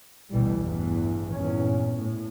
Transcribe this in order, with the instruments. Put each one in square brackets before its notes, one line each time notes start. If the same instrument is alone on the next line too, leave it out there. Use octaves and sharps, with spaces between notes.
[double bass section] A1 D2 B2 E3 G3
E2 G2 E3
E2 G2 A#2 C#4
A2